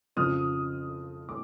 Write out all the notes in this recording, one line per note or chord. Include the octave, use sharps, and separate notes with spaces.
F2 C#3 F3 D#6 F6
D6